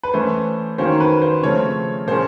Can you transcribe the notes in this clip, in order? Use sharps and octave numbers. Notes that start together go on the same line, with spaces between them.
B4
E3 A3 C#4 C5
D#3 F#3 A#3 C#4 C5
B4
C5
C#3 F3 A3 C4 C#5
A#2 F3 G#3 C#4 C5